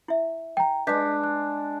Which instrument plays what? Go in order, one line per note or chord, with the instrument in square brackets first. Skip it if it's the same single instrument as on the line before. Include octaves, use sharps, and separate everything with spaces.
[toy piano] E4 E5
[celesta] G5 A#5
[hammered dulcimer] G#3 D4 [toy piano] B4 D#5 [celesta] G6 B6
[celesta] F#6